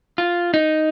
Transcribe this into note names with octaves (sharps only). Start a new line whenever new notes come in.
F4
D#4